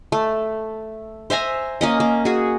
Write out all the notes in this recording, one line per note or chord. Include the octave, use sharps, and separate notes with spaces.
A3
C5 E5 G#5 A#5
A#3 C#4 D#5
A#3
F#4 G#4